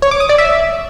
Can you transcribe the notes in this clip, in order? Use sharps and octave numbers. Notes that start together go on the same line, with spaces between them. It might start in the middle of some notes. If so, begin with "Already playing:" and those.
C#5
D6
D#6
D5
E5